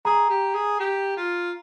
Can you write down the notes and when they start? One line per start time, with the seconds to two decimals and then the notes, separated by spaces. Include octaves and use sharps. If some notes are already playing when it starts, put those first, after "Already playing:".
0.05 G#4 A#5
0.30 G4
0.54 G#4
0.80 G4
1.17 F4